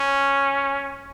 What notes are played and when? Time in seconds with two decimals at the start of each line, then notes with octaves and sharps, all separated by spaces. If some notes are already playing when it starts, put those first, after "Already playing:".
Already playing: C#4